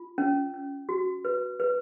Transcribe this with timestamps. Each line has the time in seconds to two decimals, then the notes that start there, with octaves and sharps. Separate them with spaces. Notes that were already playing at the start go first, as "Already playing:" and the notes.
Already playing: F4
0.18 C#4
0.54 C#4
0.89 F#4
1.25 B4
1.60 B4